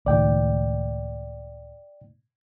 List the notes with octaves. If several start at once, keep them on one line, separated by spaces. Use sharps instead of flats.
C#2 A2 D#3 D5 G5